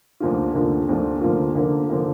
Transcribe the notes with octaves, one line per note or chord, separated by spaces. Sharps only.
D2 D3 F3 A#3 F4
D2 D3 F3 A#3 F4
D2 D3 F3 A#3 F4
D2 D3 F3 A#3 F4
D3 F3 A#3
D3 F3 A#3